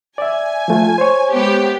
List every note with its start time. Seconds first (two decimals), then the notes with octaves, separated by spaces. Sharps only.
0.18 D5 E5 G#5
0.68 F3 A3 F4
0.98 C5 C#5
1.31 G#3 B3 G4